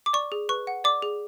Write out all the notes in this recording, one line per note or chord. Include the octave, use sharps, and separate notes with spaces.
D6
D5 C#6
G#4
B4 C#6
F#5
D5 D6
G#4